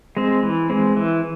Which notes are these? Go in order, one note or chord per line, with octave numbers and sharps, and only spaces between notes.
G#3 C4
E3
G#3 C4
E3